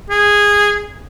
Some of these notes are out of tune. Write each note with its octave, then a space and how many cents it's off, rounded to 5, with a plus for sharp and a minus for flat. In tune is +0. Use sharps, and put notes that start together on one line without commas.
G#4 -10